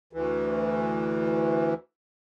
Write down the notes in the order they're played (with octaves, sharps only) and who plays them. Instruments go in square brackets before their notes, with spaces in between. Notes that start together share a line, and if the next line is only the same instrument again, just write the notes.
[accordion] D2 E3